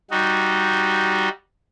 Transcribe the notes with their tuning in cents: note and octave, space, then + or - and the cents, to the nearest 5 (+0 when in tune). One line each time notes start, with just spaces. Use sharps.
G3 -10 D#4 +0 F#4 -10